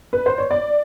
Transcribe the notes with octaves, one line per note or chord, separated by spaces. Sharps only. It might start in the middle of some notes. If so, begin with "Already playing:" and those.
B4
C5
C#5
D5